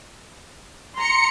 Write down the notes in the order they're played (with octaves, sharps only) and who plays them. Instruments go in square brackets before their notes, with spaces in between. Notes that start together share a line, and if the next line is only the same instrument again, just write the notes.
[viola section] A#5 C6 [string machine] C#7